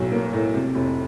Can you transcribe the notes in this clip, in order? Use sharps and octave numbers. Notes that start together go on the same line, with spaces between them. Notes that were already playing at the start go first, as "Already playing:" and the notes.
Already playing: B1 A2 F#3
A#3
A2
C3
F1